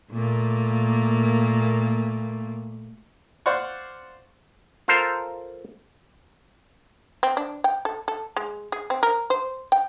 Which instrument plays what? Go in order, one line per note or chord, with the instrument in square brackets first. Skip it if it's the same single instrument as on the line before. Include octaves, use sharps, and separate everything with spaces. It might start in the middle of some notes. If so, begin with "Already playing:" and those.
[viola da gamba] A#2 A3 A#3
[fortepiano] C5 D5 F5 F#5 C#6
[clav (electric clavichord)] F4 A4 A#4 C5 F5
[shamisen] C4
D4
G5
A4
A4
G#3
G#4
C4
A#4
C5
G5